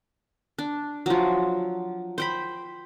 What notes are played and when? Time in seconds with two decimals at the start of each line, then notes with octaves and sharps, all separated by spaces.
0.58 D4
1.06 F3 F#3
2.18 C5 G5 B5